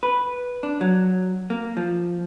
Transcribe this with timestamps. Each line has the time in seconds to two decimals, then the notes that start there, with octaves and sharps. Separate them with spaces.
0.03 B4
0.63 D4
0.81 F#3
1.50 A#3
1.77 F3